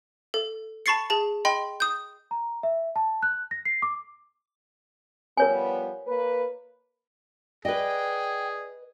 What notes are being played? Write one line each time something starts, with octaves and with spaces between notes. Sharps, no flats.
A4
A5 B5 C#6 A6 C7 C#7
G#4 A5
D#5 G5 B5 C6
D#6 G6
A#5
E5
A5
F#6
A#6
C7
D6
F3 G3 B3 A#4 C#5 G#5
A#3 B4
G#4 B4 D5 D#5 G5